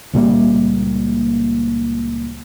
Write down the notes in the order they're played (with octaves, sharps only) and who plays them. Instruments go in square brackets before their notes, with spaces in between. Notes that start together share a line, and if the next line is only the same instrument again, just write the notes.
[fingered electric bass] C#2 A#2 G3 A#3